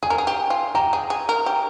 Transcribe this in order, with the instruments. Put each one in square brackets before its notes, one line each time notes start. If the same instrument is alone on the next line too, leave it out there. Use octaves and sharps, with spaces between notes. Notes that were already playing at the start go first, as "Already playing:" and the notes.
[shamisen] G#4 [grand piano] G#5
[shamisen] A#4
G#4
G4
F4
[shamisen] G4 [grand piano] A#5
[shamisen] G#4
G#4
A#4
G4